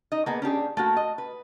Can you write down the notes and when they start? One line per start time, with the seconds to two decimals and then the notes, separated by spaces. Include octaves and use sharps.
0.12 D#4 D#5
0.26 A#3 B3 G#4
0.42 C#4 D4 G4 G#4
0.77 A3 A#3 F#4
0.97 D#5
1.18 B4